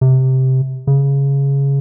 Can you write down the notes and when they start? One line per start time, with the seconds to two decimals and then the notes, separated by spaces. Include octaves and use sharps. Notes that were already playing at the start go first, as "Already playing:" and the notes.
0.01 C3
0.87 C#3